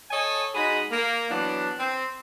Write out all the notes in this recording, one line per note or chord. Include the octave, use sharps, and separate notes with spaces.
A4 C#5 D#5 G#5
G#3 D#4 F#4 G#4 B5
A#3
E3 F#3 B3 D4
C4